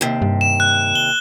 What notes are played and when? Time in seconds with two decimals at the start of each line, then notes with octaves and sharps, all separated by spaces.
0.01 D#2 C3
0.22 G2
0.41 E7
0.60 F#6
0.95 G7